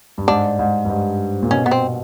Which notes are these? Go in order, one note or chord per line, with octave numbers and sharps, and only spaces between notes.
G2
G#2 D4
G#2
G2
G#2
A#2
B2 C#4
B3
C4